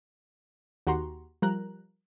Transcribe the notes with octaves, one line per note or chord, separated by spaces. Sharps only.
D#2 F#4 G4 F#5 A#5 C6
F3 G3 A#4 A#5 F#6